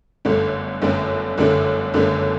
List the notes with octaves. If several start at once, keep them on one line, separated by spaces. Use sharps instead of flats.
G1 F#2 D3 A3 D4
G1 F#2 D3 A3 D4
G1 F#2 D3 A3 D4
G1 F#2 D3 A3 D4